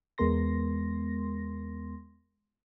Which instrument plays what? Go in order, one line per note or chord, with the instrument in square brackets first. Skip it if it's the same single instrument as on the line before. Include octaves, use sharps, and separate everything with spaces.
[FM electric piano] E2 G#3 B3 A#4 C6 A#6